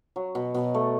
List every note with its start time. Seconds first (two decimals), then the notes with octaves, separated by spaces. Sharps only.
0.16 F#3
0.35 B2
0.55 B2
0.75 A3